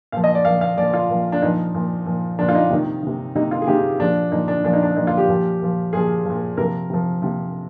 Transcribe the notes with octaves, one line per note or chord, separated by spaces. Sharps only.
A#2 F3 F5
D#5
D5
A#2 F3 F5
F5
A#2 F3 D5
F4
A#2 F3
D4
A#2 F3 D#4
A#2 F3
A#2 F3
A#2 F3 D4
F4
D#4
C3 D#3
C3 D#3
C3 D#3 D#4
F4
G#4
C3 D#3 G4
A#2 F3 D4
A#2 F3 D#4
D4
A#2 F3 D4
D#4
D4
A#2 F3 D#4
F4
G4
A#2 F3
A#2 F3
A#2 F3 G#4
A#2 F3
C3 F3 A#4
C3 F3
C3 F3